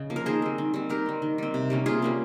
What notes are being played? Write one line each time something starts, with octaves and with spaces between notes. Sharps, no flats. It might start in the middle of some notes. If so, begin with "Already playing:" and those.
Already playing: C#3 D#5
F3 A#3
A#4
D#3 G#4 C5
G3 C4
D#3
G3 C4
D#3 G4 A#4
G3 C4
D#3
G3 C4
C3
G3 A#3 C#4
C3 F4 G#4
G3 A#3 C#4